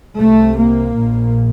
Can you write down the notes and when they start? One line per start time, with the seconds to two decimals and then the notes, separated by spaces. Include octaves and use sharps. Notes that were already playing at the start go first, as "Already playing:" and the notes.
0.17 C2 C3 A3
0.56 A#3
0.94 A#1 A#2